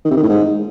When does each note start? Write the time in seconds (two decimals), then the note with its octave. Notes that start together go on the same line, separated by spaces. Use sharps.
0.05 D#3
0.11 C3
0.17 D#3
0.23 A2
0.29 G#2